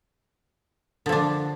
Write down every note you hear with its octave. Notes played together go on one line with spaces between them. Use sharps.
D3 F3 D4